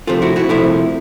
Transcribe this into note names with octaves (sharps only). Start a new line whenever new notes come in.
C2 C3 F3 A3 F4
E4 F#4
E4 F#4
C2 C3 F3 A3 E4